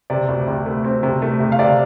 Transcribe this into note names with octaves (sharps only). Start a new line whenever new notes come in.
C3 D5
D2
C3
A3
C4
C3
A3
C3
F5
C3 D5